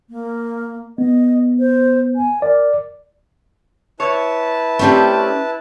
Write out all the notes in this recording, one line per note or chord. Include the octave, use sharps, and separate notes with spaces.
A#3
B3 D#5
C5
G#5
A#4 D5
E4 B4 C#5 A5
A3 C4 C#4 G4 D5